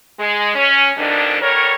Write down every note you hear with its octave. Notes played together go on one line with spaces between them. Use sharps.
G#3
C#4
F2 G#2 B2 D#3 D4
D3 G3 A#4 C#5